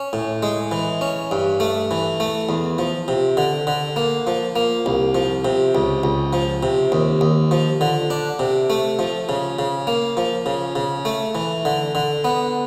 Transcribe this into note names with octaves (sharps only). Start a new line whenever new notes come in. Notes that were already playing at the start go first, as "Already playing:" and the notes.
Already playing: C#4
A2
G#3
E3
C#4
G2
A3
E3
A3
E2
F3
C3
D3
D3
A#3
F3
A#3
C2
F3
C3
C#2
C#2
F3
C3
D#2
D#2
F3
D3
D4
C3
A3
F3
C#3
C#3
A#3
F3
C#3
C#3
A3
E3
D3
D3
B3